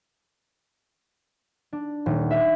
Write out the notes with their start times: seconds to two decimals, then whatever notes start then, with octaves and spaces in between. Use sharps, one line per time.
1.73 D4
2.06 D#1
2.31 E5